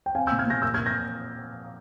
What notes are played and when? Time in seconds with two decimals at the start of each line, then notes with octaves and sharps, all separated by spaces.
0.06 G5
0.15 C4 F5 G#5
0.27 A#2 E6 G6
0.39 F6 G#6
0.47 A#2 G6 A#6
0.62 A#3 E6 G6
0.74 A#2 F6 G#6
0.86 G6 A#6